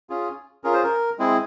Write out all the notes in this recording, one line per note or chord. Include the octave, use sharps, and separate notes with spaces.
C#4 F4 G#4
C#4 F4 G#4 A#4
C5
A#4
G#3 C4 E4 G#4